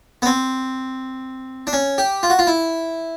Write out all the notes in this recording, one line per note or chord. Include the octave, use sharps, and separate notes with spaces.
B3
C4
D4
C#4
G4
F4
F#4
F4
E4